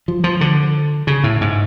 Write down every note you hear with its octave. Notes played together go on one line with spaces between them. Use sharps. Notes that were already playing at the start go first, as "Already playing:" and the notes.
F3
F3
D3
C#3
A2
G#2